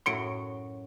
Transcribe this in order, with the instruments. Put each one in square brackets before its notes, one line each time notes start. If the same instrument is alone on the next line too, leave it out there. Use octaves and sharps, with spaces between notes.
[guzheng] F#2 A2 F#3 [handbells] C6 C#7 D7